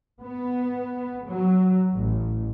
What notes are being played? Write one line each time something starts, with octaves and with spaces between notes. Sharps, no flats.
B3
F#3
A1